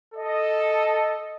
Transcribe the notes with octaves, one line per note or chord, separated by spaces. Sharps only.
A4 D#5